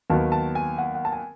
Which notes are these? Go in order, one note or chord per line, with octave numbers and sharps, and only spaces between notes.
D#2 D#3 F#3 B3 A5
A5
G#5
F#5
F#5
A5
G#5